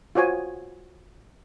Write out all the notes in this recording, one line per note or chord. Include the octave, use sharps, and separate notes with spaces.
F4 F#4 C5 C#5 G#5